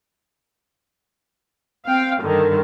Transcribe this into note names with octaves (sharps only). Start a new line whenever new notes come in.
C4 F5 G5
G2 D3 D#3